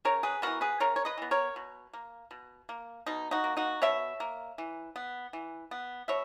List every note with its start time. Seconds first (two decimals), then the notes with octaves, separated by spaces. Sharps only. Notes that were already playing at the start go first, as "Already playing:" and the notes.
0.05 C#3 A#4 C#5
0.23 G#4 B4
0.42 E3 B3 F#4 A#4
0.61 G#4 B4
0.80 C#3 A#4 C#5
0.96 C#5
1.05 B4 D#5
1.18 E3 B3
1.31 A#4 C#5
1.56 B2
1.93 A#3
2.31 B2
2.69 A#3
3.06 B2 D#4
3.31 D#4 F#4
3.44 A#3
3.57 D#4 F#4
3.82 B2 C#5 E5
4.20 A#3
4.58 E3
4.96 B3
5.33 E3
5.71 B3
6.08 B2 C#5 E5